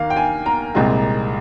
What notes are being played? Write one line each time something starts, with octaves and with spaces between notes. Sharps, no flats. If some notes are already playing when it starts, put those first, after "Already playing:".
Already playing: D#2 A#3 F5
G5
G#5
A#5
C2 A#2 G#3 C4